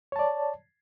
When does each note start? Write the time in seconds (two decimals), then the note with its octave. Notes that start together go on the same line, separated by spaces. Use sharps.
0.12 C#5
0.16 A5
0.19 D5